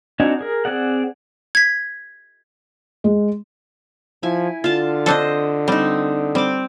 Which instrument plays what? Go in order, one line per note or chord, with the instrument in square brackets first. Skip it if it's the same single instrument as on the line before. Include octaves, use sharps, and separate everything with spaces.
[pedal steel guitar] C4 D4 D#4 F#4 G#5
G#4 A#4
C4 G#4 D5 F#5
[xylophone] G#6 B6
[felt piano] G#3
[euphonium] F3 [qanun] E4 G#5
[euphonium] D3 [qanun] F4 A5
[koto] C4 D4 A4 [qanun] C5 D#5
[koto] G3 [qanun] C4 D#4
[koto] G3 [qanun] C4 D6